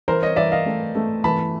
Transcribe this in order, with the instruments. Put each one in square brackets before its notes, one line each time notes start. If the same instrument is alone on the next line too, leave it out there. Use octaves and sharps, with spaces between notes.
[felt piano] E3 [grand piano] A#4 C5
[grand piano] C#5 D#5
[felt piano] E3 [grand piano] D5 E5
[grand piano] D#5 F5
[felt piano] A3
A3
[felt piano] E3 [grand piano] A5 B5